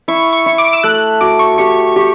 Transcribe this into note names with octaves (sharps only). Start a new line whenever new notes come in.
E4 C#6
C#6
E4
D6
E6
A3 F#6
F#6
F#4 D6
C#6
G4 C#6
G4